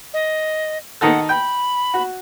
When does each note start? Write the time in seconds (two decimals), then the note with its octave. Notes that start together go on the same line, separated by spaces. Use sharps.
0.13 D#5
1.01 D#3 D#4 A4 F#5
1.29 G5 B5
1.94 F#4